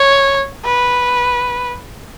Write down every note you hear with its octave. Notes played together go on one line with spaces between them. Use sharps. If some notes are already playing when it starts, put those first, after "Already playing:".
Already playing: C#5
B4